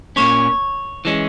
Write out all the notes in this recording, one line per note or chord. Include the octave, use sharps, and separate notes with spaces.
A#2 A#3 C#4 C#5
E3 G#3 C#4